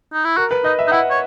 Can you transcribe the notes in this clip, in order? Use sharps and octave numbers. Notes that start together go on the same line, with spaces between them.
D#4
E4
F#4 A#4
B4
D#4 D#5
E5
D#4
E4 F#5
C#5